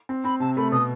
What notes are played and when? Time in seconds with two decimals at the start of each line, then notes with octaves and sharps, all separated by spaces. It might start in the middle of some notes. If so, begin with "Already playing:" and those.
0.09 C4
0.24 C4 B5
0.40 C3 A5
0.57 A3 B5
0.72 B2 D#6